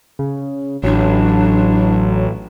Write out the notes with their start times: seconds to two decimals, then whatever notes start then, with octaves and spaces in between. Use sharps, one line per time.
0.19 C#3
0.83 A1 F#3 D4